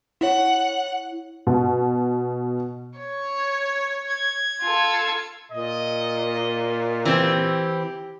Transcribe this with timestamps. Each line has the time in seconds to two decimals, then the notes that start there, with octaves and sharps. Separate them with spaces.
0.21 E4 C#5 F#5
1.47 B2
2.99 C#5
4.07 G#6
4.62 F4 A4
5.51 A#2 D#5
7.05 E3 C4 G4